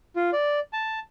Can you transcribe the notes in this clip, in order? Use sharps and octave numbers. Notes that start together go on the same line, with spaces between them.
F4
D5
A5